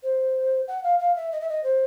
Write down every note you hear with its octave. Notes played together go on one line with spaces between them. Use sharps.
C5
F#5
F5
F5
E5
D#5
E5
D#5
C5